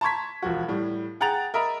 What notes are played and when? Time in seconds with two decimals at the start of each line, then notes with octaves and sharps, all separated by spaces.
0.01 A5 A#5 C6 C#6 G#6 B6
0.42 E1 F3 F#4
0.68 A2 G3
1.21 G#4 F#5 G5 A#5 A6 F7
1.54 A#4 D#5 E5 A#5 B5